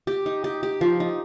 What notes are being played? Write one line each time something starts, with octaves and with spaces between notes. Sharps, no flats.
G4
D#4
G4
G4
F3
D#4